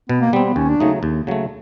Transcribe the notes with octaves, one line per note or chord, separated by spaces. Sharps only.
B2 B3
A#3
G3 B3 C4
B3
D#2 C#4
D4
C#3 F#3 A3 D#4
D#2
C#3 F#3 A3